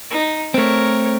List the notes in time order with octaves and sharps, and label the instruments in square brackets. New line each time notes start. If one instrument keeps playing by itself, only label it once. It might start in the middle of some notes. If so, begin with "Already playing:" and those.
[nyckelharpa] D#4
[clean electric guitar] A3 C4 [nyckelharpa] A#4 C#5